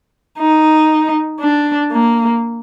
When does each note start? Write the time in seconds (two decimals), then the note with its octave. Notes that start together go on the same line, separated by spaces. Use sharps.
0.39 D#4
1.40 D4
1.92 A#3